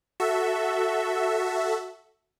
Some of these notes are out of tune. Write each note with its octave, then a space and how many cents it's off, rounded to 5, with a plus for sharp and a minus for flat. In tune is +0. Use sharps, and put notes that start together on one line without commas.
F#4 +0 A4 +0 E5 +0